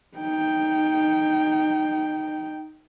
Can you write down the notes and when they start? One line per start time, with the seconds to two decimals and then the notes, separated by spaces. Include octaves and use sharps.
0.17 D#4 G5